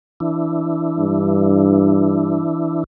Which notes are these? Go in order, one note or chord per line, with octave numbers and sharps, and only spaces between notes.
E3 D4 E4
G2